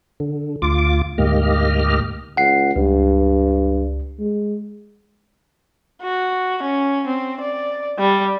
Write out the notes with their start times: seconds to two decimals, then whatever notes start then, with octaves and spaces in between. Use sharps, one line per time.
0.20 D3
0.62 D2 F4 D6
1.18 D2 G#2 A#3 G4 D#5 F6
2.37 C#2 F#5 C7
2.76 C#2 G2
4.19 G#3
6.02 F#4
6.63 C#4
7.07 C4
7.40 D5
7.99 G3